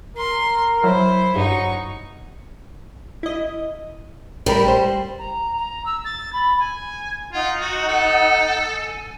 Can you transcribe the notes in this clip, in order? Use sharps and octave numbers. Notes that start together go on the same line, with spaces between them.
A#4 C6
F#3 E4 C5
G2 F#3 D#4 C#6
E4 D#5
A1 G3 A#4 B5
C5
A#5
A#5
E6
A6
B5
G#5
D#4 F4 F#5
F#4
A4
G#5